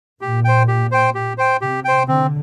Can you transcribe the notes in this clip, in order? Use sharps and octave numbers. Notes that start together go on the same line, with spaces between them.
A#2 G4
C5 G5
G4
C5 G5
G4
C5 G5
C3 G4
C5 G5
D3 C4